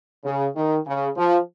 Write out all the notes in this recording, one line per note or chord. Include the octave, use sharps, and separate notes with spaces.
C#3
D#3
C#3
F3